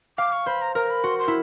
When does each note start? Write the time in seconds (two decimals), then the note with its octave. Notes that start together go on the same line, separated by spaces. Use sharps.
0.18 F5 D6
0.32 C#6
0.46 C5 B5
0.62 A#5
0.75 A#4 A#5
0.90 B5
1.04 F#4 C6
1.19 C6
1.28 E4